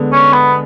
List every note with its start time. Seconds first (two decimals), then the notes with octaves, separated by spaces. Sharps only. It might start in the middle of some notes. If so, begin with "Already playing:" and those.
Already playing: D3 G#3 B3
0.12 C#4
0.33 B3